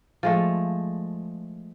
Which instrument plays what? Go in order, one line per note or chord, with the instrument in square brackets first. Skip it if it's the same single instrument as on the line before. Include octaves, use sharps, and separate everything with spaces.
[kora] F3 G#3 A3